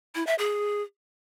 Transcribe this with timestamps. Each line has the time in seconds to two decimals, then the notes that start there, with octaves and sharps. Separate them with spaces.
0.15 E4
0.27 E5
0.38 G#4